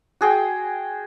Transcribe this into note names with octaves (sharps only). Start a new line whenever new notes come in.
F#4 G#4 G5